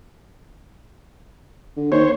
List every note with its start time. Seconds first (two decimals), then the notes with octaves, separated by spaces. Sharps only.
1.77 D3
1.92 D#2 C5 C#5